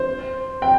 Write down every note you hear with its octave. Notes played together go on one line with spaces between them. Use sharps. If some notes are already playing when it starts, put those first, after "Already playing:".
Already playing: C5
G5